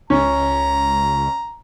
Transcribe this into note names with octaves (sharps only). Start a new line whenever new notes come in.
C#2 C#4 A#5